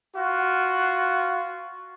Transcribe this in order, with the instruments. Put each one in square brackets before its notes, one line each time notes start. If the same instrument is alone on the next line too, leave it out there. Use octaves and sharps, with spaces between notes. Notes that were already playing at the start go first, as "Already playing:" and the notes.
[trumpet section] F4 F#4